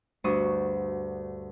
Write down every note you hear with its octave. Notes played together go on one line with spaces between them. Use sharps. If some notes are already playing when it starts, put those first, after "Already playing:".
D2 G2 D4 F#4 C#6 D#6